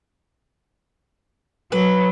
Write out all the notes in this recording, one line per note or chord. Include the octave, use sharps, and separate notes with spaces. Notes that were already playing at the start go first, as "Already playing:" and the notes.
F#3 B4